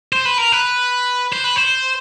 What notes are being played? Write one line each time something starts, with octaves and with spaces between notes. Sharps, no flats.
C5
B4
A#4
B4
C5
B4
C5